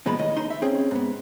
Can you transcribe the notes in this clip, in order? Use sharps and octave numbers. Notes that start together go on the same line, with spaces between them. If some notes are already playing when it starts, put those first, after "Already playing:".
E2 A#2 G#3 B3 B5
A2 D#3 D#5
D#2 D#4 C6
E5
C4 C#4 G#4
G#2 B3